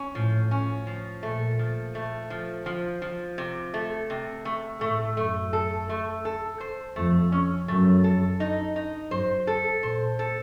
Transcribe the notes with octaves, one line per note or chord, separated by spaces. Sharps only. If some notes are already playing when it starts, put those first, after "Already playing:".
Already playing: C#4
A2 F3
C#4
F3
A#2 A3
F3
A3
F3
F3
F3
C3
A3
C3
A3
A2 A3
F#2 A3
A4
A3
A4
C5
F2 A3
C#4
F#2 A3
A4
D#4
D#4
F#2 C5
A4
A#2 C5
A4